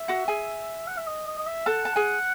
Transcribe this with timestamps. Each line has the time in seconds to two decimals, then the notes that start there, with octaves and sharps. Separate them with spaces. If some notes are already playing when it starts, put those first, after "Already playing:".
Already playing: E5
0.08 F#4 F#5
0.28 G#4 G#5
0.87 F#5
0.97 E5
1.07 D#5
1.27 D#5
1.38 D#5
1.47 E5
1.66 A4 F#5 A5
1.85 A5
1.96 G#4 G#5